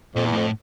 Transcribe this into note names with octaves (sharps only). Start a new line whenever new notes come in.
F2 A#2
E2
F2 A2